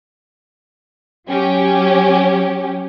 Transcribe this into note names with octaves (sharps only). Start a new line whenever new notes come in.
F#3 C#4 G4